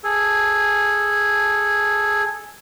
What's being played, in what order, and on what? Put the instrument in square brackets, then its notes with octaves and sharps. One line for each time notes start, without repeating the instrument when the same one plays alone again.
[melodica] G#4 A4